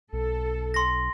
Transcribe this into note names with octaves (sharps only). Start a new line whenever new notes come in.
B1 A4
C6 A#6